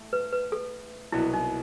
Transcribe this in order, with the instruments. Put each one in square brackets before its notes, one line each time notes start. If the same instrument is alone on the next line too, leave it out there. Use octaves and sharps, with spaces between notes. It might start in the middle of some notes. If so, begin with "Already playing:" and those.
Already playing: [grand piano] A2 A3
[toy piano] B4
B4
A4
[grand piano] C2 B2 F#3 B3 [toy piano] E4
[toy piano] D#4